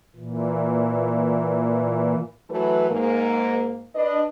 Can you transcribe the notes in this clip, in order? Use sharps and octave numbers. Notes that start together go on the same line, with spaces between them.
A#2 E3
E3 F#3 A3 B4
G#2 A#3
D4 B4 D#5